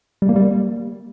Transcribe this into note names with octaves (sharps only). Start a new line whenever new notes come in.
G3
A#3
G3